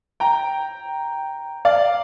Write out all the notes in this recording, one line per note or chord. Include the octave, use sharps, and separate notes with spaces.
G5 A#5
D5 F5